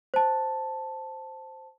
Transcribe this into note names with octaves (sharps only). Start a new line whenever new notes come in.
C5 A5